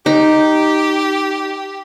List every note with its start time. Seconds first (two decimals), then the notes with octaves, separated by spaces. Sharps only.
0.06 D#4 G4